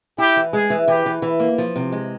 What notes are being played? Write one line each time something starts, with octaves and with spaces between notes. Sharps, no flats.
E4 G4
E3
G#3 G#4
E3
E3 G4
E3
E3
A#3
F3
C3
G#3